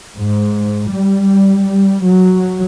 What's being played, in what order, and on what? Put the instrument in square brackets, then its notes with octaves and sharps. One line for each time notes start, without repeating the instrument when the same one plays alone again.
[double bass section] G#2
G3
F#3